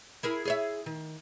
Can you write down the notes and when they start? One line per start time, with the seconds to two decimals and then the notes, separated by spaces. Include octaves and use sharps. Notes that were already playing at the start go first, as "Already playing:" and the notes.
0.23 E4 G#4 A#4
0.45 G#4 C#5 E5
0.86 D#3